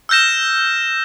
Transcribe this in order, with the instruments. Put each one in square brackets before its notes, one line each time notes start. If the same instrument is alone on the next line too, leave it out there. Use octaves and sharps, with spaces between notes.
[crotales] E6 F6 G6 A#6 E7